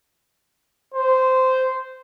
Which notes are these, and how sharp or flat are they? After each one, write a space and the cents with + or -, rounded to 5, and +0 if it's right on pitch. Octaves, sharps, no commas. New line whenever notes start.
C5 -10